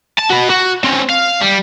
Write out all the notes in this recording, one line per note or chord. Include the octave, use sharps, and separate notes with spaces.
A5
F#4 B4
F#4
C4 C#4
F5
G3